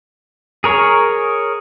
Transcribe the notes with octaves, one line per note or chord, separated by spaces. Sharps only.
G#4 A#4 C#5